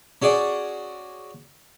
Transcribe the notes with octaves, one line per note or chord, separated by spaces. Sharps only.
C#4 F#4 G#4 D5